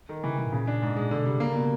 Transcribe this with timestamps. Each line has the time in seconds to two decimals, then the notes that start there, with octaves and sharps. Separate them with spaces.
0.09 D#3
0.24 C#3 E3
0.38 C3 E3
0.46 A2
0.52 A#2 C#3
0.67 D4
0.82 G#2
0.96 A#2 G#3
1.11 B2 D3
1.25 C3 G3
1.40 C#3 A#3
1.55 B2